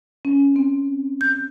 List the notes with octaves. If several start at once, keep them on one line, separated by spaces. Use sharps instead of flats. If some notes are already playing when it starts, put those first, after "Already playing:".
C#4
C4
G6